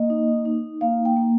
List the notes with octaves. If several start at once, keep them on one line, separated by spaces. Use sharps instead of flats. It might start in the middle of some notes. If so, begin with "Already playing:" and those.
Already playing: A#3 D#5
D#4
D#4
A#3 F5
G5
A#3